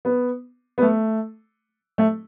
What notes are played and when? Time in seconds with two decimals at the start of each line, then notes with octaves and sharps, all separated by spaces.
0.05 B3
0.78 B3
0.82 A3
1.98 A3